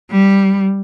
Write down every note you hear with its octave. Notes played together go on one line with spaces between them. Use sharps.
G3